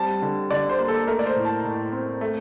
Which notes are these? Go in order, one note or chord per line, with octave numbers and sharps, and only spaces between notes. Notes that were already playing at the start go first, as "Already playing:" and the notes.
Already playing: G3 C4 A5
D3
D3 D5
C5
A#3
A4
A3 A#4
D5
C5
A2
A5
A2
C4
A3